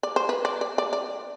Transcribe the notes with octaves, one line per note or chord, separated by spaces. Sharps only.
D5
C5
B4
D5
D5
D5
D5